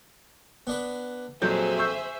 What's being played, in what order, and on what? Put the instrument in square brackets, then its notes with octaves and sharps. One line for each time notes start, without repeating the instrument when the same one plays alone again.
[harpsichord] B3 D4 B4
[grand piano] A#1 F#3 G6 [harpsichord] F2 [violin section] G#4 C5 E5
[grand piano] C#6 E6 G6